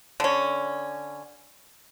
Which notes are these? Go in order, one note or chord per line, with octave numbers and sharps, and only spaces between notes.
D3 C#4